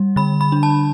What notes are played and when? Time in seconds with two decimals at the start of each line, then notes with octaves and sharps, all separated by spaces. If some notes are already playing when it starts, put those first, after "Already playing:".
Already playing: G3
0.16 D3 B5
0.41 B5
0.52 D4
0.63 A5